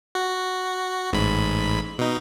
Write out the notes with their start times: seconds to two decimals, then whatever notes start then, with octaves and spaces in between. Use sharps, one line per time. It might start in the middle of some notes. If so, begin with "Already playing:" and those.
0.15 F#4
1.13 A1 G#2 B5
1.98 B2 D#4